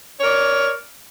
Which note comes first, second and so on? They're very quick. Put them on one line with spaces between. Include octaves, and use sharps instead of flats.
C#5 A#4 D5